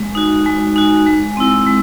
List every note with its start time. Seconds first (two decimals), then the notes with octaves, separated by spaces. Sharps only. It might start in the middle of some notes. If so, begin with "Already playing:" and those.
Already playing: G#3 G#5
0.15 D#4 F#4
0.45 G#3 G#5
0.76 D#4 F#4
1.06 G#3
1.37 C4 E4
1.67 G#3